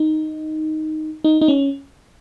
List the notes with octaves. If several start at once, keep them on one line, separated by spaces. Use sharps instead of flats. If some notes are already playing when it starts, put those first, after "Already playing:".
Already playing: D#4
D#4
D#4
C#4